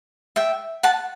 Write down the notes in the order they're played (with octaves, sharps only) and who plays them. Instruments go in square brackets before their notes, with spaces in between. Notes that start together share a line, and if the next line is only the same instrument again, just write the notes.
[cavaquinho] E5 G5
F#5 A5